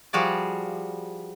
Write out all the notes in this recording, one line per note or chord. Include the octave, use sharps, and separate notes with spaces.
F3 G3 F#4 G#4 D5